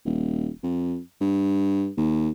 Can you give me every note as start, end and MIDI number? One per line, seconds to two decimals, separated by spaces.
0.05 0.49 27
0.63 0.98 41
1.21 1.89 43
1.97 2.30 39